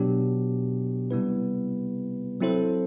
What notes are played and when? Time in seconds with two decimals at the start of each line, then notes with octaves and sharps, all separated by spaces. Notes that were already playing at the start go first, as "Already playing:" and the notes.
Already playing: B2 F#3 B3 D4 G4
1.11 C3 G3 B3 E4 B4
2.40 F#3 C4 E4 A4 C5